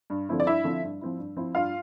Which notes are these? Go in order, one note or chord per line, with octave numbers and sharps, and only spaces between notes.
G2
D3 F3 C4 E4
D5
G2 E4 E5
D3 F3 C4 E4
G2
F3 C4 E4
G2
F3 C4 E4
G2 F4 F5